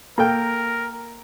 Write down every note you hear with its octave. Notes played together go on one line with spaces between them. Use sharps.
A#3 A4 A#4 G5